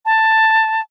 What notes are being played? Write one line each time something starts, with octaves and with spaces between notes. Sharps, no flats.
A5